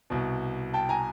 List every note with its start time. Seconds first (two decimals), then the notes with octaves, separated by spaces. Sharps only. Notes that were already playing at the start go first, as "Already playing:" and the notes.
0.10 C2 B2
0.74 G5 A5
0.89 G#5 A#5